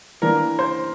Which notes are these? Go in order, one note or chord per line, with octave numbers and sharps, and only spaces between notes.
E3 A#3 D4 A#4
C5